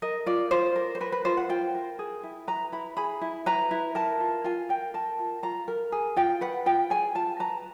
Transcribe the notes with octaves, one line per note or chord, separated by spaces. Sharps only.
A#4 D#5
F4 D5
F4 C5
A#4
C5
A#4 B4
B4
F4 C5
F#5
F4 G5
A#4
G#4
E4
B4 A#5
E4 B5
G#4 B5
E4
B4 A#5
E4
A#4 A5
F4
F4 G#5
A#4 G5
A#4 A5
F4
F4 A#5
A#4
G#4
F4 G5
B4 F#5
F4 G5
G#4 G#5
F4 A5
B4 A#5